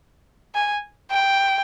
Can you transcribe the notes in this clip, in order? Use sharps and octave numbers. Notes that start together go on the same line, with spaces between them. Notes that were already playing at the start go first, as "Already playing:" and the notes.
G#5
G5